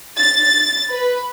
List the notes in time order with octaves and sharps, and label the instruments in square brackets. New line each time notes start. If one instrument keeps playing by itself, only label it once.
[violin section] A6
B4